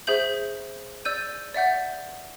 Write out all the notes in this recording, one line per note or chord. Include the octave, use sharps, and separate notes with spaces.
G#4 C5 E5 G6 F#7
D5 E6 G6 D#7
D5 E5 F#5 G6